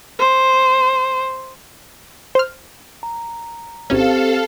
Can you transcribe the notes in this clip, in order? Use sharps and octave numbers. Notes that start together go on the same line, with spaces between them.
C5
C5 F6
A#5
G#1 C4 C#4 G4 A4 C5 F5